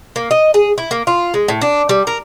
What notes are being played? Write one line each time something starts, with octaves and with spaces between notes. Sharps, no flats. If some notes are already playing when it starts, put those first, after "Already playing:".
A#3
D#5
G#4
E4
A#3
F4
G#3
A2
D4
G3
A#4